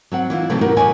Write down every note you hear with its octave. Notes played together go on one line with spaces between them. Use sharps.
F#3 C4 F#5
E3 E4 F4
C3 E3 F#3 A3 B3
F#3 G4 A#4 B4 F#5
D#2 B2 B3 C#5 G#5